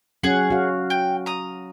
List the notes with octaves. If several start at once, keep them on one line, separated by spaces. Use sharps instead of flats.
F#3 C#4 G#4 F#5
F#4 F5
G5
A#5 D#6